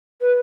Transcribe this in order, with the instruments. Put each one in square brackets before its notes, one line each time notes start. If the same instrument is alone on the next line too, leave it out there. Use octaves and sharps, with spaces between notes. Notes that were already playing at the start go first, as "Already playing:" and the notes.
[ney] B4